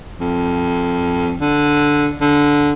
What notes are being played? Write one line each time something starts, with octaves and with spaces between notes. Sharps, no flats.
F2
D3
D3